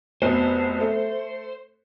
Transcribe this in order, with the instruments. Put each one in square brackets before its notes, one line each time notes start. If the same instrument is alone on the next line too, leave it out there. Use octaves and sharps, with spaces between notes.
[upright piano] F1 B2 [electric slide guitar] C5
[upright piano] A3